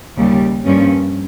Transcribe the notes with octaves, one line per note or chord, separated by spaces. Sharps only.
D#2 C#3 G3
G2 F3 A#3 C#4